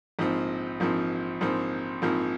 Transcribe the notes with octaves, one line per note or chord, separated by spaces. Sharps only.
A#1 G#2 F3 C4
A#1 G#2 F3 C4
A#1 G#2 F3 C4
A#1 G#2 F3 C4